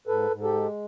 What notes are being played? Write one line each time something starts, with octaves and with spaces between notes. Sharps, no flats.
G#2 A4 B4
G#2
G4 A4
G#3